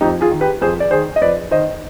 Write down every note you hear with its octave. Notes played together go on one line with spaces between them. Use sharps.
F2 D#4 G4
F4 G#4
D#3
G4 B4
F2 G#4 C5
D5
D#3 G#4 C5
D#5
F2 B4 D5
D#3 C5 D#5